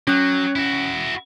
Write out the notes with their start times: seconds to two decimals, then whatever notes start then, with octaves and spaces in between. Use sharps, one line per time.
0.08 F#3 C#4 F#6
0.56 E4 F#4